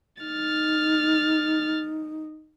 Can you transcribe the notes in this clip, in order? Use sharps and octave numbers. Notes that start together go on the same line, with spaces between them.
D#4 F6 A6